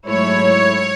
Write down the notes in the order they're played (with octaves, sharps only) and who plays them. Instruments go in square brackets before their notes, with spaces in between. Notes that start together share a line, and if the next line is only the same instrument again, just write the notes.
[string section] G#2 F#3 A3 E4 C#5